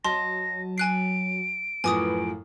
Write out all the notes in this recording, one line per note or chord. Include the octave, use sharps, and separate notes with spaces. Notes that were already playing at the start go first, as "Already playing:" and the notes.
F#3 D#5 A5 C6 A#6
G#5 F#6 C7 D7
F#2 A2 F3 B4 G#5 D6 D#6